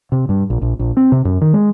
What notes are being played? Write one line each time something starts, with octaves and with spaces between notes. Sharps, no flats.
C3
G2
A#1
A#1
A#1
C4
C3
F#2
D#3
G#3